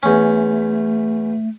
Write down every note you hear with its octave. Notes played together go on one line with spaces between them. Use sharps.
E2 A3 C#4